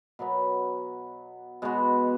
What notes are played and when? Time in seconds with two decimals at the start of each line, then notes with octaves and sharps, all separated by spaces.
0.19 B2 F#3 B3
1.62 B2 G#3 B3 F#4